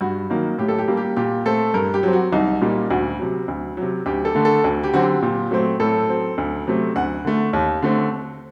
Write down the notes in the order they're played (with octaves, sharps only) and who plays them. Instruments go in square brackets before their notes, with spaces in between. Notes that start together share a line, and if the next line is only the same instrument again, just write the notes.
[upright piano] G2 F#4
D#3 F#3 A#3
A2 G4
A4
G4
G3 A#3
G4
A#2 G4
A3 C4 A4
G2 A#4
G4
F#3 C4
F#4
C2 D#4
A#2 G3 A#3
D2 F#4
C3 F#3
D2
C3 F#3
D2 G4
A4
D3 A3
A4
D2
G4
D3 F#3 C4 F#4
G4
A#2
F#3 A3 C4
A2 A4
F#3 C4
D2
C3 F#3 A3 C4
D2 F#5
D3 A3
D#2
D3 A3 C4